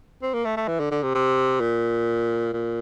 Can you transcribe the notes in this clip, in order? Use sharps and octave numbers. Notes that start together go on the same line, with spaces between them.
C4
A#3
A3
A3
E3
D3
D3
C3
C3
A#2
A#2